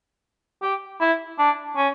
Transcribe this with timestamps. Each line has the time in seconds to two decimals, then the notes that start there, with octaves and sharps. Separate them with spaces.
0.62 G4
1.00 E4
1.38 D4
1.76 C#4